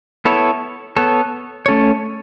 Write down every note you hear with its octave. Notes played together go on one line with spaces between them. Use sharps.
B3 E4 A4 C#5
B3 A4 C#5
A3 C#4 A4 C#5